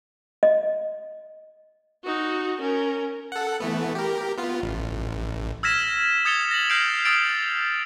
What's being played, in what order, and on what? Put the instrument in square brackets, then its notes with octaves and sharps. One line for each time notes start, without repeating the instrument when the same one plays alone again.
[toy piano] D#5
[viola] D#4 F#4
C#4 A#4
[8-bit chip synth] A4 F#5
E3 A3 B3
G4 A#4
B3 F4
A1
[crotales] E6 F6 G#6 A#6 B6 E7
D#6 G#6 A6 C#7 F7 G7
A#6 F#7
F6 G6 C7 D7 F7
D#6 E6 A6 D7 F#7